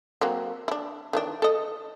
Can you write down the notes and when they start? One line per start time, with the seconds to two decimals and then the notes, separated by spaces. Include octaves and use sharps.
0.21 F#3 A#3 C4
0.68 D4 E4
1.13 D#3 E3 D4
1.42 A4 D#5